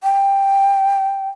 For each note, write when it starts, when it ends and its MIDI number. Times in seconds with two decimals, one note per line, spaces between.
0.03 1.29 79